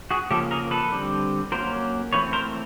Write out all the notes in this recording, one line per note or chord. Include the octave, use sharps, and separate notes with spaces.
F#4 G#4
C#3 F3 A#3 C#4 G4 A4
G#4 A#4
A4 B4
D3 G3 C4
F#3 A#3 C#4 A#4 C5
E3 A3 C4 B4 C#5
A#4 C5